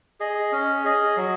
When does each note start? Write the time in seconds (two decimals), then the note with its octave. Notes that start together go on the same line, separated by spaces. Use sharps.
0.20 G#4 D#5
0.52 C#4
0.84 G#4 D#5
1.17 F#3